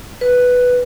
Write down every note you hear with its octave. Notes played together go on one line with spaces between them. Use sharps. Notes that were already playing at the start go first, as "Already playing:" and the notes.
B4